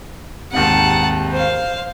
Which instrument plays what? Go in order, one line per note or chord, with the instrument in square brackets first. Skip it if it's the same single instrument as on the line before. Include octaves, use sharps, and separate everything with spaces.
[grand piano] D#2 G#2 C3 [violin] F#5 A5
[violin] C5 F5